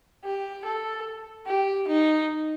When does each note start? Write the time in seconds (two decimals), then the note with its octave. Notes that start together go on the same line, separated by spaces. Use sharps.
0.24 G4
0.65 A4
1.46 G4
1.87 D#4